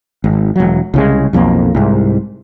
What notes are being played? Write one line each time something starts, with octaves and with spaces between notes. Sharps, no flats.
G#1
E1 F#3
C2 C#3 G#3
B1 F2 F#3 A#3
C2 G#2